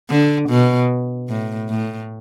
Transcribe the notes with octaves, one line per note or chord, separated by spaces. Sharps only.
D3
B2
A2
A2